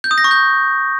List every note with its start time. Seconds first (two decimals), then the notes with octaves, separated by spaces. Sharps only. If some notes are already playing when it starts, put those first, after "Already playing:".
0.04 G6
0.11 D#6
0.18 A#6
0.24 C#6
0.31 G6